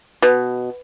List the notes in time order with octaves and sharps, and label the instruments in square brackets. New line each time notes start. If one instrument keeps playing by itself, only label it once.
[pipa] B2